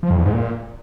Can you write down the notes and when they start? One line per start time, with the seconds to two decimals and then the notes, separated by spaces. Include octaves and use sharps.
0.03 F3
0.10 F2
0.18 E2
0.25 G#2
0.33 A#2